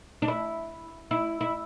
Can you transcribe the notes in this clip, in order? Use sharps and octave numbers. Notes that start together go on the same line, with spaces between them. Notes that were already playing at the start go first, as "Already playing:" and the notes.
D4
E4
E4
E4